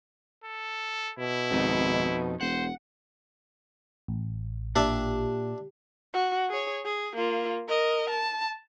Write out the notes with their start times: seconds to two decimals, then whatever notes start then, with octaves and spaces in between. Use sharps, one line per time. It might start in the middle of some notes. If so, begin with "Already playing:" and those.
0.44 A4
1.19 B2 E4
1.51 G#1 F2 D#4
2.41 E1 C5 F#5
4.08 A1
4.76 A#2 D4 G4 D5 E5
6.14 F#4
6.49 G#4 C#5
6.85 G#4
7.16 A#3 F4
7.68 A#4 D#5
8.10 A5